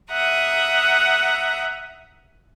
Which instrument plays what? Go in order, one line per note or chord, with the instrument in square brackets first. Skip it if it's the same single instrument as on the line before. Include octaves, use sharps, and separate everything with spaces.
[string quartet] E5 F#5 A#5 D#6